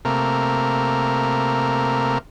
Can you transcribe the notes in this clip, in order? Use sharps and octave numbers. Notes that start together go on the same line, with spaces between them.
C3 A3 A#3 A#4